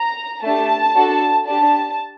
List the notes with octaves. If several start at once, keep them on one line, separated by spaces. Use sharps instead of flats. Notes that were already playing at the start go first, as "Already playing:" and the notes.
Already playing: A#5
A3 D4 G4 A5
D4 F#4 A4
D4 G4 A5